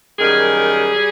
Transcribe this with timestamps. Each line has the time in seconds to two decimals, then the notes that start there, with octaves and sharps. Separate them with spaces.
0.19 F#2 D#3 G3 G#4
0.94 G3